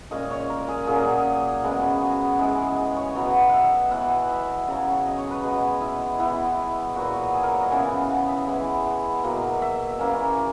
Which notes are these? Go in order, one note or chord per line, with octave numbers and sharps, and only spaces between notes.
A#2 G#3 C#4 D#5
C#5
A#4
G#4
A#2 F#3 A#3 C#4 G#4
G#4
G#4
C#3 G#3 B3
F#4
E3 G#3 C#4
C#5
B2 F#3 B3
E5 F#5
E3 B3 F#5
E5
C#3 F#3 C#4
D#5
C#5
B4
B2 G#3 B3
E4
E3 B3 E4
A#2 F#3 B3 F#4
G#4
A#4
C#5
D#5
C#3 E3 B3 G#5
F#5
E5
E3 G#3 B3
E5
B2 F#3 A#3
E5
E3 A#3 C#4